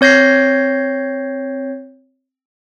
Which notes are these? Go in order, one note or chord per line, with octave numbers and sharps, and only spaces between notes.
C4 C#5 G6 A#6 C7